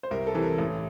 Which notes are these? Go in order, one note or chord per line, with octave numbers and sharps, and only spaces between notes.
C5
C2 A#4
A4
C3 E3
A#4
A1